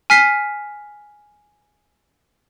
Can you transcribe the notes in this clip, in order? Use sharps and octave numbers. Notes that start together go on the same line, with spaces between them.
G#5 F6 B6 C7